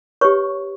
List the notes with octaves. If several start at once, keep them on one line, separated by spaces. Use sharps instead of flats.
G4 B4 C#5 C#6